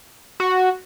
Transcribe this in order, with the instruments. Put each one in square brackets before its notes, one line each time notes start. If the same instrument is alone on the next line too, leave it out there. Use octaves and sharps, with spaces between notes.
[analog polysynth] F#4